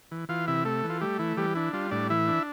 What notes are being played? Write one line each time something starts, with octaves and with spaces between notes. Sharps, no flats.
E3
E3 F4 F5
C3 E4 E5
A3 A4
E3
F4
G3 A3 G4
E3 E4
E3 G3 G4
D4 E4
G3 F4
A2 D4 D5
E3 E4 E5
D4